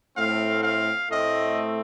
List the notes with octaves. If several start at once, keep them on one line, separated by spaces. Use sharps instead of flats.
A2 A3 C4 F5
F5
A2 A3 C4 D#5